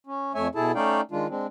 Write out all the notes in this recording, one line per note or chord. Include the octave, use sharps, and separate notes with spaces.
C#4
F2 A3 C#5 E5 G#5
B2 E4 G#4 A4 A5
A3 C#4 D#4 D5 F5 G5
D#3 G#3 D4 F4
G#3 C4 D4